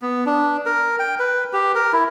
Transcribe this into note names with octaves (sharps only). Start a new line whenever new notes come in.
B3
D4
A#4
G5
B4
G4
A#4
E4